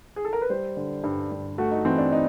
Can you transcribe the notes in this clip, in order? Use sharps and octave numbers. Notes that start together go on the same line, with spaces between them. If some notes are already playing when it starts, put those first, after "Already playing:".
G#4
A4
A#4
B4
G3 C5
D3
G2
G2
A3 F#4
D#4
E3 C4
D4
D#4